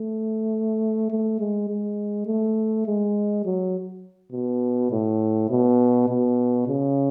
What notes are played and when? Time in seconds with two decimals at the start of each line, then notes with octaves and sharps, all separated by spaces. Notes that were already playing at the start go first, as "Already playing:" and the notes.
Already playing: A3
1.10 A3
1.40 G#3
1.69 G#3
2.27 A3
2.86 G#3
3.45 F#3
4.32 B2
4.91 A2
5.50 B2
6.09 B2
6.67 C#3